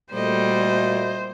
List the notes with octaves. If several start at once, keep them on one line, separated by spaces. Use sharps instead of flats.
A#2 G3 A3 F#4 C5 D#5